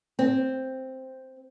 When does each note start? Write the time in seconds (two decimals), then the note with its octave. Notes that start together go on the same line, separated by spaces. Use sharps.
0.19 C4